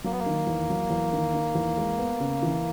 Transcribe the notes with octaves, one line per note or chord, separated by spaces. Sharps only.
F#3 A#3
B3
A#3
D#3
E2
F#3
E2
D#3
D#3
E2
G#3
B3
C#3
E3